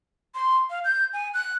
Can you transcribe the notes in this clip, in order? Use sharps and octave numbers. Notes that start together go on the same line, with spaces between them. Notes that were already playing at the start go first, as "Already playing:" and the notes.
C6
F5
G6
G#5
F#6